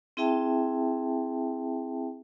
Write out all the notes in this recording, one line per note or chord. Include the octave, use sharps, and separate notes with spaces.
C4 E4 G#4 E5 G5 A5